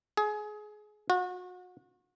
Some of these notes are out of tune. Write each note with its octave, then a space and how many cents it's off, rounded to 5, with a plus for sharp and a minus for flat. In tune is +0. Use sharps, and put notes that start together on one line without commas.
G#4 +25
F#4 -35